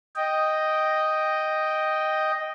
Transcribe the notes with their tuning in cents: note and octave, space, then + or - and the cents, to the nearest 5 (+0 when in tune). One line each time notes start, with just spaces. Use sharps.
D#5 +0 G5 +0